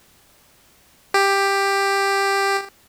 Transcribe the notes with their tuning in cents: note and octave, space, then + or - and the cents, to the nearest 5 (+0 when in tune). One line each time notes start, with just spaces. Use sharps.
G4 +10